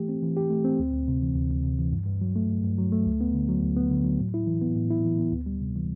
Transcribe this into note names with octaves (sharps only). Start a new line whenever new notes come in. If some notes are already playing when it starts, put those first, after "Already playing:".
Already playing: E3 A3 G4
C4
E3
G4
A3
C4
D2
D2
C3
E3
D2
D2
C3
E3
G2
G2
F#3
A3
G2
G2
F#3
A3
D2
B3
D3
F#3
D2
B3
D3
F#3
A2
E4
E3
B3
A2
E4
E3
B3
D2
G3
C3
E3